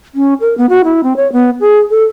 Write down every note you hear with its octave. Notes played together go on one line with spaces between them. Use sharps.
C#4
A#4
B3
F#4
E4
C4
C#5
B3
G#4
A4